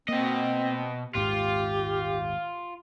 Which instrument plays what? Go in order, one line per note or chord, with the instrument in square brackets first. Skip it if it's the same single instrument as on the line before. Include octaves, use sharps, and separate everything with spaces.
[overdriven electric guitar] B2 D#5 [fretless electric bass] A#3 [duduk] C4
[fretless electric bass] D#1 G#1 G#2 [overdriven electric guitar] F4 [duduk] G4